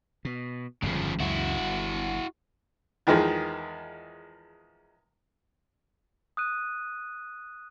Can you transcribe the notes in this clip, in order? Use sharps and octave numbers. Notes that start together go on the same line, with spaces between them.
B2
G1 F2 G#2 C#3 F3
C#2 F#2 E3 E4 F#4
G1
E2 D#3 F3 G#3
D#6 F#6 D#7